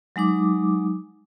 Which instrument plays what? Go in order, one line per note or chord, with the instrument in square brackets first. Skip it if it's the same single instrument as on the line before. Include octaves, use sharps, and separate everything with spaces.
[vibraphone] F#3 G#3 D#4 D6